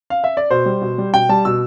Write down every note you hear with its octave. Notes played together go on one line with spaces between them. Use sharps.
F5
E5
D5
B2 C5
G3
B2
G3
B2 G5
G3 A5
B2 E6